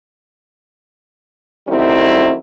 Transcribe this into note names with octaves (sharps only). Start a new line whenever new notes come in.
F#2 D#3 G3 A3 C4 E4